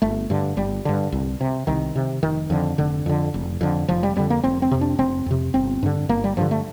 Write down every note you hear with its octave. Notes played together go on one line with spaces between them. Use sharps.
G1 A3
G2 D3
G1 G3
G2 D3
C2
C3
C2 D#3
C3
F1 D#3
F2 D3
F1 D3
F2 D3
F1
F2 D3
F1 F3
G3
F2 D3 G3
A#3
F1 C4
C4
F2 C3
D4
F1 C4
F2 C3
G1 C4
G2 D3
G1 A#3
G3
G2 D3 F3
A3